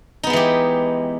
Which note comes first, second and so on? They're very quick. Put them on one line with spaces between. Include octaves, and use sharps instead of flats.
D#4 B3 G#3 E3 G4